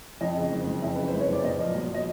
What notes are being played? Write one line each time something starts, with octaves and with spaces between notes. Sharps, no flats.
F2 D#5
C#3
F#1
F#1
F2 E5
C#3 B4
C5
F#1
C#5
F#1 D5
A#2 D#5
F3
B1
D#5